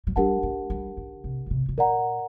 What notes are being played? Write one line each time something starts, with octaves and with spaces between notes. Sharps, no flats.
F#3
G3 D4 G4 A#4 F#5 A5
A3
G3
D#3
C3
A#2
C3
C3
A#2 A#4 D5 F#5 A#5